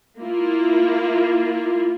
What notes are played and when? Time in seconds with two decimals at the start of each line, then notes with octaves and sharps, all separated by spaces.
0.20 A#3 E4 F4